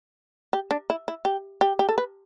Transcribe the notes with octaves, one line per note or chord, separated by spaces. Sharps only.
G4
D4
E4
E4
G4
G4
G4
A4
B4